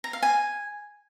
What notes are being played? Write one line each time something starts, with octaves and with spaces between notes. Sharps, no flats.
A#5
F5
G#5